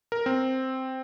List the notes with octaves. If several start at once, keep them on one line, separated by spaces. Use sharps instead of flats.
A#4
C4